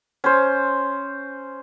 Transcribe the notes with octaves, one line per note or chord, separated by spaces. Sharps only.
C#4 C5